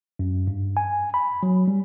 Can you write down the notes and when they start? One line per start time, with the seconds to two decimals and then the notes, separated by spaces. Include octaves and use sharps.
0.19 F#2
0.47 G2
0.77 G#5
1.14 B5
1.43 F#3
1.68 G3